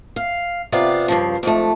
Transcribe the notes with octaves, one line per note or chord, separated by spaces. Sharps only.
F5
C3 B3 F4 D5 F5
G2 C#3 F3
F2 G#2 A3